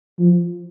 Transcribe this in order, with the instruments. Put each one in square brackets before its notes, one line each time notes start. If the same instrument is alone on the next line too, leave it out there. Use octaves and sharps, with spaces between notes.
[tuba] F3